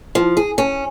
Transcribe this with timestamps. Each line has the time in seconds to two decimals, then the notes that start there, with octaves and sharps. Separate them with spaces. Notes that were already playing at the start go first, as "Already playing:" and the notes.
0.15 F3
0.37 G#4
0.58 C#4